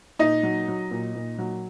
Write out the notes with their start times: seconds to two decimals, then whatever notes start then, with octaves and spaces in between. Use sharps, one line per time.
0.19 A#2 D#4 D#5
0.43 F#3
0.68 F#3
0.91 A#2
1.15 A#2
1.39 F#3